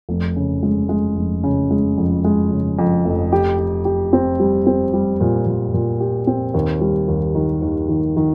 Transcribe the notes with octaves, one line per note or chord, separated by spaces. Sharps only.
F1
C#3
G#3
G#3
F1
C#3
G#3
F2
G#3
C#3
F2
F1
G4
G4
G4
C4
G3
C4
G3
A#2
A#2
A#2
G4
C4
D#2
G3
D#2
D#3
D#2
D#3
D#3